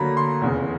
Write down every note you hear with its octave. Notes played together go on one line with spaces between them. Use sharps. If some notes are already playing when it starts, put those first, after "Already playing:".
Already playing: D2 D3 F#3 A#3 A#5 B5
C6
F1 E2 C#3